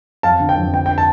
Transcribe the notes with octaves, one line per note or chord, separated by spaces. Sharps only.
F2 F5 A5
D3
G5
F2
D3 G5
G5
A5